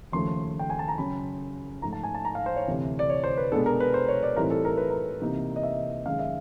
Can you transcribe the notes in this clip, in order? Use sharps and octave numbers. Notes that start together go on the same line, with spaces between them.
D#2 C#3 F3 A3 C6
G5
G#5
A5
A#5
F#2 C#3 F#3 B5
G#2 F3 A3 A#5
A5
G#5
A5
A#5
F5
C5
C#5
D2 C3 E3
D5
C#5
C5
B4
B2 G#3 B3 D4 A4
A#4
B4
C5
C#5
D5
A2 E3 G3 C4 D#4 A#4
A4
A#4
B4
A#4
C3 E3 G3 A#3 D#4
D#5
E5
F#2 D#3 G#3 C#4 F5
E5